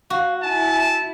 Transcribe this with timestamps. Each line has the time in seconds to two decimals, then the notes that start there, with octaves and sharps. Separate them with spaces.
0.10 F#4 F5
0.43 E4 G#5 A5